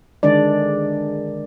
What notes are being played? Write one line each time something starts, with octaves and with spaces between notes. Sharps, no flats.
D3 D#3 G#3 D4 D5